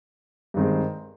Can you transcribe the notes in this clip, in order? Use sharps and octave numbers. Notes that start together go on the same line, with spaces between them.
G2 D#3 G#3 C4